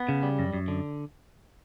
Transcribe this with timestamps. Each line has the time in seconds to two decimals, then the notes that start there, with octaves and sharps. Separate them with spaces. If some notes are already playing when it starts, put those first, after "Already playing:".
Already playing: B3
0.09 C#3
0.23 G3
0.39 F#2
0.53 F#2
0.68 D3